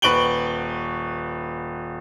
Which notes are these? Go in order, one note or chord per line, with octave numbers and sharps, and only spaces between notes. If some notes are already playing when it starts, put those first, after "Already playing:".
D#1 B4 C#6 D7 F#7 G7